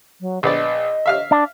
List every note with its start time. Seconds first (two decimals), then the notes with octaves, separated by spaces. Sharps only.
0.21 F#3
0.43 A#1 B3 D5 D#5
1.06 E5 F5 F6
1.31 D4